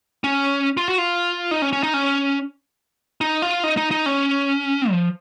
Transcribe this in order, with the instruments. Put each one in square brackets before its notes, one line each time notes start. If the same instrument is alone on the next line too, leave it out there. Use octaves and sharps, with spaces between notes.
[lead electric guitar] C#4
F4
F#4
F4
D#4
C#4
C#4
D#4
C#4
D#4
F4
D#4
D#4
D#4
C#4
F3